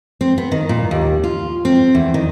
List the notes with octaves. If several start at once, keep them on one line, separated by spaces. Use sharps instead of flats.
C4
B3
D#3
A#2
D#2
F4
C4
E2
D#3